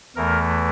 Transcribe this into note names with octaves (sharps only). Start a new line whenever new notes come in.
E2 E3 A3 A#4